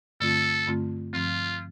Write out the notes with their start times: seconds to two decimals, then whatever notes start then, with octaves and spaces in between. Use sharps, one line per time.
0.20 G2 D3 A3 C4 F4 A4
0.67 G2 D3 A3 C4 F4
1.13 G2 F3 C4 F4